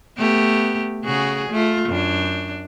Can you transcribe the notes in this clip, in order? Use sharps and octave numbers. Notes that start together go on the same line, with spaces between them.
A3 B3 G4
C#3 F#4 G#4
A3 F4
F#2 D4